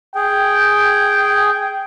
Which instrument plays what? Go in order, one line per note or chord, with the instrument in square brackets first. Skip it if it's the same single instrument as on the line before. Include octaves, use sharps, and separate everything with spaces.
[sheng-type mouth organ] G#4 [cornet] G5